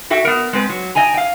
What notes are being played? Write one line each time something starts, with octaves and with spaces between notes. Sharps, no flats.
F#4 A4 E5 G5
B3 A#4
G#3 C4 B4
F#3
D#5 G5 G#5 A#5
F5 G5